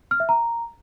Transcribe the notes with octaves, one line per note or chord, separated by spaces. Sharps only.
F6
E5
A#5